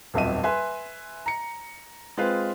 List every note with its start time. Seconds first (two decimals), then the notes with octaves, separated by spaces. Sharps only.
0.14 D#1 B1 F2 E5 D#7
0.43 B4 E5 G#5 C6
1.26 A#5 C#7
2.17 G#3 C4 F4 G#4 B4 F5